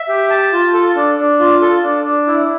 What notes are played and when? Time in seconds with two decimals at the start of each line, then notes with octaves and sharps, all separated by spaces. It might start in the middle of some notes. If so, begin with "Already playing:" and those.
Already playing: E5
0.08 G4
0.30 A5
0.53 F4
0.74 A4
0.95 D4
1.18 D4
1.40 F4
1.62 A4
1.84 D4
2.05 D4
2.27 E4